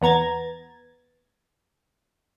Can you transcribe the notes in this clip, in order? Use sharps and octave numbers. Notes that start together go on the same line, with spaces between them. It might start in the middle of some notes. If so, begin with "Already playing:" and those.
E2 B3 A#5 G#6 A6